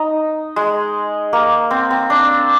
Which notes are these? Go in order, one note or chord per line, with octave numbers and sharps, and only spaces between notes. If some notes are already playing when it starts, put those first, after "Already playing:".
Already playing: D#4
G#3
A#3
C4
C4
D4